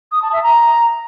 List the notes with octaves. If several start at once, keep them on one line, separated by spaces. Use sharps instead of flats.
D#6
A5
E5
A#5